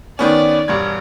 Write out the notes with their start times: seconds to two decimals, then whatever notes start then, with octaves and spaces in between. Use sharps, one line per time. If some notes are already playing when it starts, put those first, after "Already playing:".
0.19 D#3 B3 C#4 D5
0.68 E1 G2 G#6